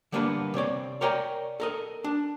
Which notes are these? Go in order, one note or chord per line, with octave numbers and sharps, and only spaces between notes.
D3 G3 A#3 B3 D4 B4
C3 C4 C#5 D5
A#4 C#5 D5 G5 G#5 A#5
A4 A#4 D#5
D4